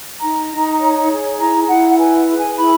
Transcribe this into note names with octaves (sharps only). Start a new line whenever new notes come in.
D#4 A#5
D#4
C#5
G#4
E4 A#5
E4 F#5
F#5
B4 G#5
G#4
G#5
E4 B5